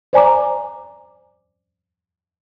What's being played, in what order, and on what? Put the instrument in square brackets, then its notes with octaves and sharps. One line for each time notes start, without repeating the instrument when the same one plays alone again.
[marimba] C5 D5 G#5 A#5 D6